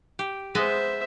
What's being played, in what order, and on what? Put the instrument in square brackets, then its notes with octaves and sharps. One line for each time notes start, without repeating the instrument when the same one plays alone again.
[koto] G4
[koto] G#3 B3 D#5 [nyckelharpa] C5 E5